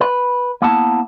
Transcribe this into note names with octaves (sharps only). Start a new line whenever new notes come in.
B4
A#3 B3 E4 F#5 A5